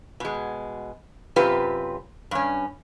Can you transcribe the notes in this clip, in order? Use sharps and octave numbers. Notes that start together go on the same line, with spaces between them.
B2 G#3
F#2 C3 C4 F4 G4 B4
G2 C#4